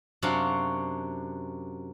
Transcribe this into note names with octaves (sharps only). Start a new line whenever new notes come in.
F#2 C3 D4 F#4 F5